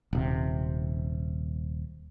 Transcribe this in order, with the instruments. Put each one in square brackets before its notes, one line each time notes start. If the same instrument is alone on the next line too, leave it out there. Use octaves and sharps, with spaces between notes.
[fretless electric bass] D#1 C3